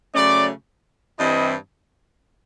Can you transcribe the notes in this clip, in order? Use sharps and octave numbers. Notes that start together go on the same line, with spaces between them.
C#3 F#3 A3 C#4 D5
G2 E3 G3 C4 E4 D#5